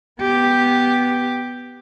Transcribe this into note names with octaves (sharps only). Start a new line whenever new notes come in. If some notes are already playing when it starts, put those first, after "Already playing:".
B3 G4